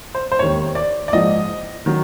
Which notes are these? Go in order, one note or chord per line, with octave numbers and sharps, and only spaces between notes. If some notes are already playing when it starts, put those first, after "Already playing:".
C5
C5
E1 D#2 D#3 C#5
D5
D5
A#1 G#2 F3 D#5
D#3 F#3